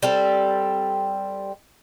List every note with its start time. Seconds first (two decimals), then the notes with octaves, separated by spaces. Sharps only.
0.02 G3 C4 A4